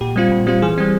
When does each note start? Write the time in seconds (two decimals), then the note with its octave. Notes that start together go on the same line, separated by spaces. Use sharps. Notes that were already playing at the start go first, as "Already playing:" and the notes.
0.01 A#2 G4
0.16 G3 C4 F4
0.32 A#2
0.47 G3 C4 F4
0.62 E3 G#4
0.78 G3 C4